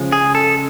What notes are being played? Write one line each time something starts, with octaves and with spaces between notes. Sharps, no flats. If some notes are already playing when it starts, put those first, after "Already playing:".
Already playing: C#3 F3 G#3
G#4
A4